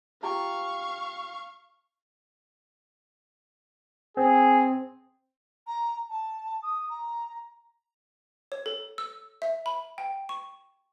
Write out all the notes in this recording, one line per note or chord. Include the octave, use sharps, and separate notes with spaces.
F4 G4 F5 A#5 C#6
C4 G#4
A#5
A5
D#6
A#5
C#5
A4
E6
E5
B5
G5
C#6